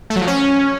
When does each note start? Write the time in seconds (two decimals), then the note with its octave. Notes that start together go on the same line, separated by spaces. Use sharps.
0.10 A3
0.16 F#3
0.22 F3
0.27 C#4